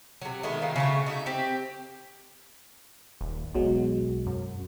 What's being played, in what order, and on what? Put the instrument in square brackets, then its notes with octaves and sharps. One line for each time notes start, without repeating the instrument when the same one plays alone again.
[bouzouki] C3 F#3
D#3 G#3 A3 B3
D#3 F#3 F4
C#3 F#3 A3
D#4 F#4 E5
C4 G4
[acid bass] D#1
[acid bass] B1 [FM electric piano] B2 F#3 G#3
[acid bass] F#2